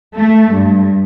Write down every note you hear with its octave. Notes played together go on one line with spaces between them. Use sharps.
A3
G2